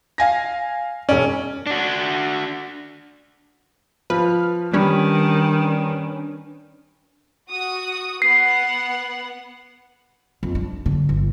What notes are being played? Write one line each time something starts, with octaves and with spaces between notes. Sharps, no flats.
F5 G#5 A#6
E1 C#4 D5
D4 F#4
F3 B4 F6
D#3 G3 C#4 D4 B4
F#4 D#6
B3 F#5 C7
F2
D4
D3
G1